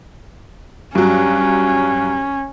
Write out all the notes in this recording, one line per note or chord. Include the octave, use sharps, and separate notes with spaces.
G2 F#3 C#4